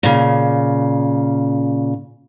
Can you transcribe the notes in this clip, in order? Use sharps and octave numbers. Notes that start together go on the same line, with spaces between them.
A#2 C#3